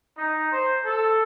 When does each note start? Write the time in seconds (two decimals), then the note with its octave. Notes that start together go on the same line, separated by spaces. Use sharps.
0.17 D#4
0.51 C5
0.85 A4